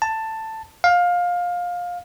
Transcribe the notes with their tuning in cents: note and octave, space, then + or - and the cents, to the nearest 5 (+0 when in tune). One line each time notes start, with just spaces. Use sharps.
A5 +10
F5 +20